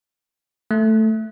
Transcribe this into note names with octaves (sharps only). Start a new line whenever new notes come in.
A3